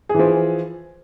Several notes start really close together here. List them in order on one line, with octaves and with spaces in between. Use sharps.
G#4 E3 F3